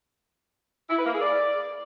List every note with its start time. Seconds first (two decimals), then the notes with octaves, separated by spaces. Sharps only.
0.89 E4
0.97 B4
1.05 A#3
1.14 G#4
1.22 D5